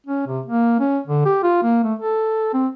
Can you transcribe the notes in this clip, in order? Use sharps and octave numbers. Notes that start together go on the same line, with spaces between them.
C#4
C3
A#3
C#4
D3
G4
F4
A#3
A3
A4
C4